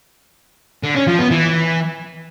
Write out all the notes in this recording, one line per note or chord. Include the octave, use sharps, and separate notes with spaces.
D3
C#4
F3
B3
E3